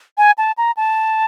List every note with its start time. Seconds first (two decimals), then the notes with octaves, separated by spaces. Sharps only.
0.18 G#5
0.38 A5
0.58 A#5
0.77 A5